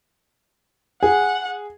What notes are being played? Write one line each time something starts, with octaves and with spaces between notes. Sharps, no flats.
G#4 F#5